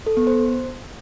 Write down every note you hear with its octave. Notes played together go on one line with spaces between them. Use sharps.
A4
B3
C5